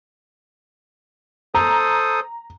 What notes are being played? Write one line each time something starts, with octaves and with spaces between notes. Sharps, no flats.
A4 C5 A#5 D#6